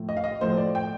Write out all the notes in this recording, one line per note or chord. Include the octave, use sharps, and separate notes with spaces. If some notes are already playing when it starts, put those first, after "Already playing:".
Already playing: A2 F3 A3
D#5
F5
D#5
A2 F3 A3 C5
D5
G5